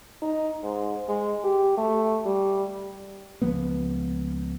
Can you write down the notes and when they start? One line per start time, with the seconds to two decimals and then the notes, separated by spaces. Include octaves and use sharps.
0.22 D#4
0.63 G#2
1.08 G#3
1.44 G4
1.77 A3
2.26 G3
3.42 C#2 F3 A#3 B3